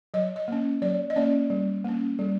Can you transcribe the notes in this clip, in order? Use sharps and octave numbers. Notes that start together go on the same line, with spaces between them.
F#3 D#5
D#5
A#3 C#4
F#3 D5
D#5
A#3 C#4 D5
G3
A#3 C#4
G3